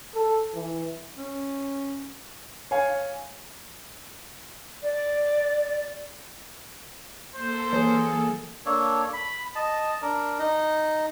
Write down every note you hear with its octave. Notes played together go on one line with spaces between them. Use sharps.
A4
E3
C#4
C#5 F5 G#5
D5
A#3 A4 C5
E3 F#3 G#4
A#3 D4 A4 C#5
B5
D#5 A5
D4 A#4
D#4